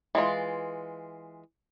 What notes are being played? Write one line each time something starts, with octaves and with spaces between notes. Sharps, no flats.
E3 G#3 F4